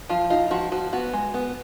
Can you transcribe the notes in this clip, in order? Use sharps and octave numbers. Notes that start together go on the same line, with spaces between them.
F3 F4
D#4 F4
F3 F#4
F3 F#4
B3 F#4
G#3
B3